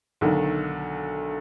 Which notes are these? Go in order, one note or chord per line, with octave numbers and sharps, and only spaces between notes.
B1 D3 D#3